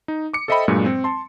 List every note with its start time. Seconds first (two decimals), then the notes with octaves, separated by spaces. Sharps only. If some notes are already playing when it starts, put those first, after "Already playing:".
0.08 D#4
0.33 D6 C#7
0.48 A4 C5 D#5 E5 G5 B5
0.68 G2 A#2 F#3 G#3
0.86 C4
1.04 A5 C6